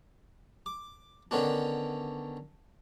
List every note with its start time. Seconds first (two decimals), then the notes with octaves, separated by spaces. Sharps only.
0.66 D6
1.31 D3 D#3 B3 C#4 D4